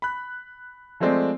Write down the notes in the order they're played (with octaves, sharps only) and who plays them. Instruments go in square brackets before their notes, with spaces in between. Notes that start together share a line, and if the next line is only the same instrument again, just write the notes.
[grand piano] B5 F#6
F3 G#3 A3 C4 D5